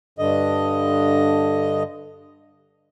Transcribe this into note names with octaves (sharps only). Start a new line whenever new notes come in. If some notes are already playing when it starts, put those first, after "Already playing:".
G2 D3 D#5